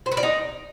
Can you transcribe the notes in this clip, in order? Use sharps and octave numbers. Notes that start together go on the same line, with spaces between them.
C5
B4
D5
D#4